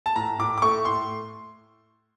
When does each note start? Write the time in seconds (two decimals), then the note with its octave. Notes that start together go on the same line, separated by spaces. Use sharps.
0.06 A5
0.16 A2 A#5
0.39 A2 D6
0.58 D6
0.62 A3 C#6
0.85 A2 C6